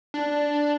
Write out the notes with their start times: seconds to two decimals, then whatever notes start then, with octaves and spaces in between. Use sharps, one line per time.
0.14 D4